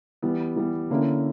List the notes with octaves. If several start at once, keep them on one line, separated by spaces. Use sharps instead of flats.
E3 G3 B3
E3 G3 B3
D3 A#3 C#4 E4 A#4